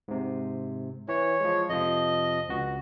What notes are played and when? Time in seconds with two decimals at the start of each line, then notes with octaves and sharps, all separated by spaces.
0.08 G#2 C3
1.08 E3 C#5
1.40 F3 G#3
1.69 F2 C3 F3 D#5
2.49 C#2 F#4